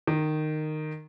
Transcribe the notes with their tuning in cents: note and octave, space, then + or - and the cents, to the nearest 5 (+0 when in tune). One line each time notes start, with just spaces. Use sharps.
D#3 -15